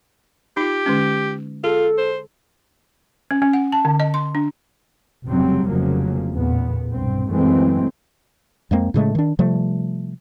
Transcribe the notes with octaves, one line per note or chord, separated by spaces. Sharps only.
D#4 F4 G4
D3 G#3 C#4
F4 G#4 A4
C5
C#4
C#4
F#5
A5
D3
D#5
C6
D4
F1 C#3 F#3 G3 C4
F1 F2 C#3 F3 F#3 A#3
A1 E2 A#2 B3
B1 G2 C4
F#2 E3 F#3 G#3 A3 C4
F2 G#3 A#3 C4
A2 C#3 G#3 A3
D#3 D4
C3 F3 G3 A3